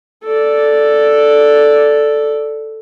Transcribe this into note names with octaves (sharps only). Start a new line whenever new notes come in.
A4 D5